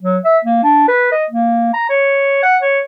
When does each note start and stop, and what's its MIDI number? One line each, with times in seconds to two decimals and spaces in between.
0.03 0.18 54
0.24 0.38 76
0.45 0.60 58
0.63 0.87 62
0.88 1.09 71
1.12 1.25 75
1.30 1.73 58
1.74 1.88 82
1.89 2.41 73
2.43 2.57 78
2.62 2.80 73